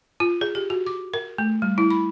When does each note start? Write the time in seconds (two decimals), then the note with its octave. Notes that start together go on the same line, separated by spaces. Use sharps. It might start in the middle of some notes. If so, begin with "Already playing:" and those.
0.20 F4
0.41 G#4
0.55 G4
0.70 F#4
0.87 D6
1.14 A#4
1.38 A3
1.62 G3
1.78 E4
1.91 B5